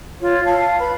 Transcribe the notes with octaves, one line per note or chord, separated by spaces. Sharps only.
F4 C#5
F5 A5
B4 B5